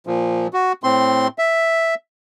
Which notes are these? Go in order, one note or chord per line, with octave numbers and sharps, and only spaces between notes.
A#2 F3
F#4
A2 C4 C6
E5